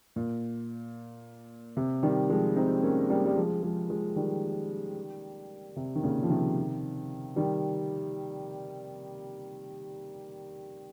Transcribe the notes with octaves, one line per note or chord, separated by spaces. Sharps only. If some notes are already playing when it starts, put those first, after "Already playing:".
A#2
C3
D#3 G3
F3 G#3
C4 D#4
A#3 C#4
G3 A#3
G3
F3 G#3
F3 G#3
F3 G#3
D#3 G3
C3
D#3
A#2 C#3
F3
C3 D#3
D#3 G3